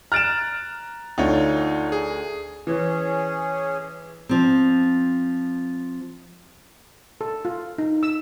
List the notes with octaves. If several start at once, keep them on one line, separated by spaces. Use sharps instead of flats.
A#5 F6 F#6 A6 D7 E7
D2 D#4 F4 C#5
G#4
E3 C#4 G#4
F3 C4
A4
F4
D#4
E6